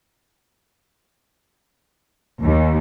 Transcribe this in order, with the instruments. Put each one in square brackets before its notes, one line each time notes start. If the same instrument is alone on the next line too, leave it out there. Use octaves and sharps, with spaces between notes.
[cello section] D#2